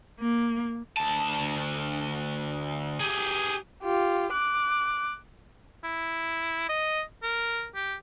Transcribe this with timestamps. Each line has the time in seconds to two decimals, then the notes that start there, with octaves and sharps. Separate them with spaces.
0.19 A#3
0.97 D2 A5
3.00 G4 G#4
3.83 F4 G4
4.33 D6 F#6
5.84 E4
6.69 D#5
7.23 A#4
7.75 G4